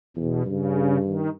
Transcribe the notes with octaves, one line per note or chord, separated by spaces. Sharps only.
E2 B2
G2 C#3
D#3